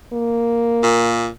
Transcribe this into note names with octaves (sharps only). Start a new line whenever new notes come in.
A#3
A#2